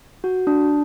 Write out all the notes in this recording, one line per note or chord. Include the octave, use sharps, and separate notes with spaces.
F#4
D4